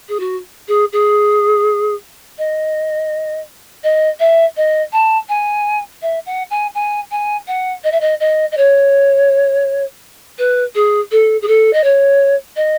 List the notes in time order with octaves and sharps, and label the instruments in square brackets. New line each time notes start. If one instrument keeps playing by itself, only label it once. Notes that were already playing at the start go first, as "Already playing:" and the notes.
[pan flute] G#4
F#4
G#4
G#4
D#5
D#5
E5
D#5
A5
G#5
E5
F#5
G#5
G#5
G#5
F#5
D#5
E5
D#5
D#5
D#5
C#5
B4
G#4
A4
G#4
A4
D#5
C#5
D#5